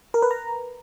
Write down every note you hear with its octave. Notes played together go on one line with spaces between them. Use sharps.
A#4
B4
A#5